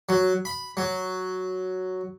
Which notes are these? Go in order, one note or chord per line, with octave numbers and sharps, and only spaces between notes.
F#3
B5
F#3